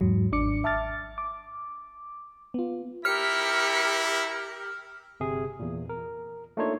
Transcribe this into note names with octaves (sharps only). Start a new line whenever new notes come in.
E2 G#2 F#3
G#1 D4 D6 C#7
E5 A5 D6 F6 A6
D6
B3 F4
E4 G4 A#4 F6 B6 C#7
G1 C3 G#4
E2 A#2
A#4
A3 A#3 D4 D#4 F4 C#5